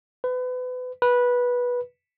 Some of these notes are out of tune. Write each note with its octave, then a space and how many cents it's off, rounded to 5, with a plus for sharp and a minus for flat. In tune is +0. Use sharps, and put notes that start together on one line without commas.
B4 +30
B4 -15